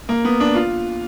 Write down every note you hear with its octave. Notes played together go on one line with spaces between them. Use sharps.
A#3
B3
D4
F4